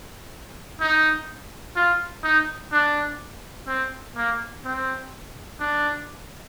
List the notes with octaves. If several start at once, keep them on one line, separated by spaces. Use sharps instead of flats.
D#4
F4
D#4
D4
C4
A#3
C4
D4